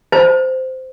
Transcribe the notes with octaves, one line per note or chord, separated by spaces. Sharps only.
C5